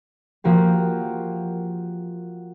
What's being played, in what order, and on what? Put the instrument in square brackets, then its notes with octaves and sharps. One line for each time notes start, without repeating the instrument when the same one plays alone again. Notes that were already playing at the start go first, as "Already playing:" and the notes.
[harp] F3 A#3 F#4 G4